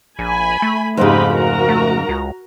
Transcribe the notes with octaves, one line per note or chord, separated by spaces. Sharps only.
A#1 G#5 B5
A3
F2 G#2 C#3 D#4 G4 B5
F#4 A#4 A#5
A3
C#2